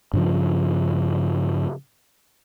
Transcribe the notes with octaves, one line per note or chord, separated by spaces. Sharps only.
G2 C#3 F3